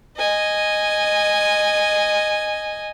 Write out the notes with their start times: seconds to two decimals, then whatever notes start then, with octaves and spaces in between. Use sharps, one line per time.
0.17 D#5 G#5